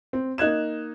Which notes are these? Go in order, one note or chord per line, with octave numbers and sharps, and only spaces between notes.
C4
A#3 D#4 F#6 G#6 E7